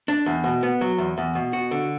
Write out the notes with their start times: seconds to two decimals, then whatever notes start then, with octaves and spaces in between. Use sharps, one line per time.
0.08 D4
0.26 E2
0.44 B2
0.63 B3
0.81 F#3
0.98 E2
1.18 E2
1.35 B2
1.53 F#4
1.71 D3